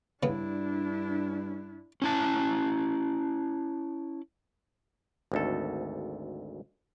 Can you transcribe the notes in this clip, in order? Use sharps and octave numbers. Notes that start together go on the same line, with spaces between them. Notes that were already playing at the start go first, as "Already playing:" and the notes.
G2 C#3 B3 D4 E4
C#4 E4 A5
G#1 D2 A4